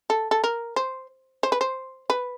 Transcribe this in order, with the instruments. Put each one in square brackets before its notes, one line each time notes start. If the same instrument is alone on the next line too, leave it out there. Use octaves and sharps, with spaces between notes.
[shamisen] A4
A4
A#4
C5
C5
B4
C5
B4